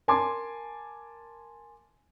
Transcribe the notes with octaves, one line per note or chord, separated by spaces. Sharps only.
A#4 G#5 A5 C6 D6